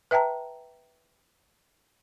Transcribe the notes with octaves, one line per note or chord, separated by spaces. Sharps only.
B4 E5 G5 A5 A#5